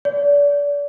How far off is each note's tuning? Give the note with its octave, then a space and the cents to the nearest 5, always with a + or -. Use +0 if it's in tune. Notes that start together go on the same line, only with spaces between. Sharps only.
D5 -35